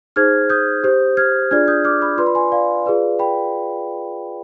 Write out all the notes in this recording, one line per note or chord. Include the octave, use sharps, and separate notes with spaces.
D#4 G#4 C5 F6 G#6
D#6 G6
G4 C5
F6 G#6
D4 F4 G#4 D5 F6 G#6
D#6 G6
D6 F6
B5 D6
F4 B4 D5 C6
B5
G#5 C6
D5 F5
F4 G#4 B4 D5
G5 B5